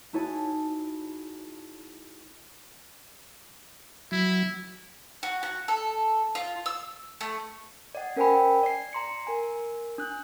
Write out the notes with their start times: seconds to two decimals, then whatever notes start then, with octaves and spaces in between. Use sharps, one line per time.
0.13 D#4 E4 F#4 G#4 C#5 A5
4.12 F#3 E4
5.23 F#4
5.43 F#4
5.68 A4
6.35 F4
6.66 E6
7.21 A3
7.95 D5 D#5 F#5
8.16 C#4 A#4 C5 G5 G#5 B5
8.63 D5 C7
8.93 A#5 C6 C#7
9.27 A#4 G#5
9.98 D4 F#6